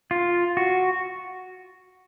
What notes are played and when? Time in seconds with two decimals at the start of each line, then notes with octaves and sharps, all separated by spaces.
0.11 F4
0.57 F#4